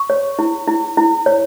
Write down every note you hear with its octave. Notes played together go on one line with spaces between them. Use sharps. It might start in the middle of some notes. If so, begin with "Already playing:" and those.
Already playing: C#6
C#5
E4
E4
E4
C#5